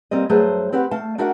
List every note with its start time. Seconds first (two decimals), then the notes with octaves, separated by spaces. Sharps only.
0.11 G3 A#3 C4 D#5
0.29 G2 F#3 A3 G#4 B4 C5
0.72 C4 G4 B4 F#5
0.91 A3 F5 A5
1.18 D4 D#4 F#4 A#4 E5 F#5